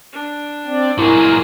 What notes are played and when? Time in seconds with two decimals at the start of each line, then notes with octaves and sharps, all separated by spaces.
0.13 D4
0.66 C4 D5
0.99 A#2 F#3 E4 G#4 A#4 D#5